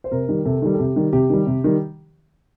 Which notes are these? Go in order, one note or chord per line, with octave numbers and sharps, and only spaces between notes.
C5
C3 A#4
D#3 G3
C3 A4
D#3 G3
A4
C3 G4
D#3 G3
C3 G4
D#3 G3
C3
D#3 G3